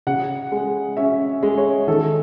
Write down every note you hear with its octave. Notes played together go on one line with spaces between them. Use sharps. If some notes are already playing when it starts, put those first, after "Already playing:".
C#3 F#5
G#3
C#4 E5
G#3
C#5
D#3 A4